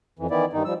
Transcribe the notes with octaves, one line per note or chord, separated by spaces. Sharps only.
F2 E3
D#3 E3 B3 E4 D5
G2 D#3 D#4
F3 G3 E6